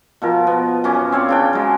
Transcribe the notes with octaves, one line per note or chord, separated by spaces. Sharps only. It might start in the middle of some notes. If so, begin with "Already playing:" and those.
B2 F3 A#4
B3
F#2 C#4 D6
C4 C#5 D5 F5
C#3 D4 G5
F#3 G#3